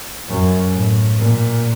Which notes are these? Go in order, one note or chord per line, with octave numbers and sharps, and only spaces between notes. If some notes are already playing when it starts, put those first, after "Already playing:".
F#2
A2
A#2